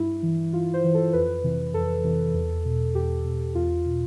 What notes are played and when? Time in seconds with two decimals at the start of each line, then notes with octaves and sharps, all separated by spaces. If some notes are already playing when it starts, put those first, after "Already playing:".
Already playing: G2 E4
0.23 E3
0.53 G2 F4
0.74 C5
0.84 E3
0.94 A4
1.13 F2 B4
1.43 C3 E3
1.74 F2 A4
2.04 C3 E3
2.34 E2
2.65 B2
2.95 E2 G4
3.25 B2
3.55 E2 F4
3.86 B2